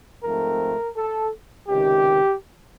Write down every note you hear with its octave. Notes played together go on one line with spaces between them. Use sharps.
G#2 F3 A3 C4 A#4
A4
C#2 C3 D#3 G4